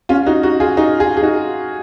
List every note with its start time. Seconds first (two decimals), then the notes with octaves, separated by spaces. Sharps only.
0.09 C#4 F4
0.26 D#4 F#4
0.43 D#4 F#4
0.60 F4 G#4
0.77 D#4 F#4
1.00 F4 G#4
1.17 G#4
1.23 D#4 F#4